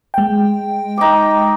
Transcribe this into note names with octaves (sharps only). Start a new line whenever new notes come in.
G#3 G5
D#4 D6